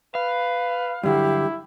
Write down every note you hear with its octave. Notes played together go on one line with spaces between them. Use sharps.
B4 F5
G2 D3 F#3 E4 G4